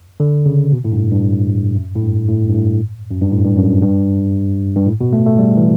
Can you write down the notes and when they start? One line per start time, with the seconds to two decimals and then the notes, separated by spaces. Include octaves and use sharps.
0.20 D3
0.46 C#3
0.72 B2
0.85 A2
0.92 G2
0.98 A2
1.11 G2
1.76 F#2
1.96 A2
2.02 G2
2.28 A2
2.49 G2
2.54 A2
3.10 F#2
3.22 G2
3.32 A2
3.45 G2
3.57 F#2
3.71 G2
3.83 G2
4.76 G2
4.87 A2
5.01 B2
5.13 A3
5.26 A3
5.38 G3
5.57 E3